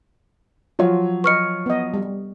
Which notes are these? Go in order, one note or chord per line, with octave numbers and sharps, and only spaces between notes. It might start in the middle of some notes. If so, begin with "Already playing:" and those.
F3 F#3 F4 C#5
B4 D#5 C#6 F6 C#7
B3 D#5
G3